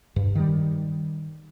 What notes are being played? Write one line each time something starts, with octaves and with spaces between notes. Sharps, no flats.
G2
D#3 G3